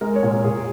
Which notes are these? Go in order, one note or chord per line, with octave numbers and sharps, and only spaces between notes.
G#3 A#4
C#5
A#2
A#4
A#2 G#4